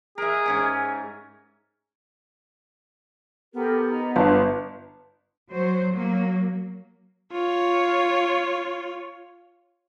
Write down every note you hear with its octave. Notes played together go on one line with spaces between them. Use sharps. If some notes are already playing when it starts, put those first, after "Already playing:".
G#4 A#4 E5
G#2 C#4 G#5
B3 G4 A4 A#4
D#4 A#5
G1 C#5 F5 A5 A#5
F#3 C5
F#3 A#3
F4 C#5